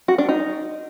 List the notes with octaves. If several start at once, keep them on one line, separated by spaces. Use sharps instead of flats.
F#4
D4
D#4